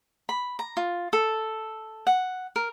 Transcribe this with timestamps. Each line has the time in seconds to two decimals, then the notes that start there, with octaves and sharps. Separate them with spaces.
0.29 B5
0.59 A#5
0.77 F4
1.13 A4
2.07 F#5
2.56 A#4